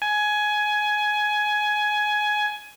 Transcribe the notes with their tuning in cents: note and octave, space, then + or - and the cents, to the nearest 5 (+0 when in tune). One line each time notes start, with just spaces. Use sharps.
G#5 +15